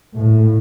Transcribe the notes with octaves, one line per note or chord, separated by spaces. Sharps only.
A2